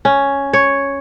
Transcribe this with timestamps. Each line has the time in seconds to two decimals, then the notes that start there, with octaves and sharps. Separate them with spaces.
0.05 C#4
0.53 C#5